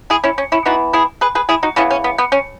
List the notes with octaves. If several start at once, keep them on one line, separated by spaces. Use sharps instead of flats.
E4 G#4
C#4 E4
C#4
C#4 E4
E3 B3 D#4 F#4
E4 G#4
G#4 B4
G#4 B4
E4 G#4
D#4 F#4
C#3 E3 B3 C#4 E4
C#4
B3
B3
C#4